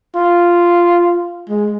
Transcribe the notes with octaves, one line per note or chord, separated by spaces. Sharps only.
F4
G#3